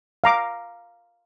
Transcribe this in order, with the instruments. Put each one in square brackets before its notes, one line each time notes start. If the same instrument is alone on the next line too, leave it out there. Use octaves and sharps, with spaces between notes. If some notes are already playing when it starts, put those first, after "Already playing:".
[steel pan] F5 A#5 D6